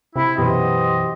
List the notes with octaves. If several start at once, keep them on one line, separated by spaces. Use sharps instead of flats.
C3 E4
F#2 B2 E3 G4 C5 D#5